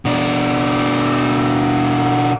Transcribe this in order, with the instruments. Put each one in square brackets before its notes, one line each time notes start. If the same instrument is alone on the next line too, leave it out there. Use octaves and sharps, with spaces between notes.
[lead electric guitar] B2 D4